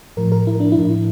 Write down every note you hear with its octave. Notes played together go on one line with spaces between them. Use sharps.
A2 F3 A#4
A#4
E4
D4
E4
A2 F3